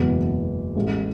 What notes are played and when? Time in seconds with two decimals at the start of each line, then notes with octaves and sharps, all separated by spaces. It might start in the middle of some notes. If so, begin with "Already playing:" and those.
Already playing: F#1 E2 B2 G#3 B3
0.75 A1 A2 E3 G#3